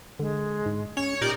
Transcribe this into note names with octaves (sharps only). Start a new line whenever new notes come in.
D3 G#3
G#2
C#4 C#5
A#2 D#4 G4 A#4 D5